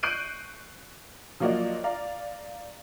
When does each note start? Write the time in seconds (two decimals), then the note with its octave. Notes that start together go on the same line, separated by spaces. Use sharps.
0.03 C#6 F#6 G6 C7 D7 D#7
1.40 F3 F#3 A#3 F#4 D5 D#5
1.84 D5 F5 A#5